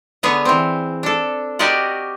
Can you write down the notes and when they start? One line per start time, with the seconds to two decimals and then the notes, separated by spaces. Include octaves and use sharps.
0.23 D3 B3 G#4 C#5
0.45 E3 C4
1.03 D4 A4
1.59 F#4 G4 A#4 D5 D#5 F#5